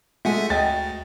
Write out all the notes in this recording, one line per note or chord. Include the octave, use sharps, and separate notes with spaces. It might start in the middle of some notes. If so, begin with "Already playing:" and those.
G#3 A3 E5 F#5 G#5
D2 D#5 G5 A6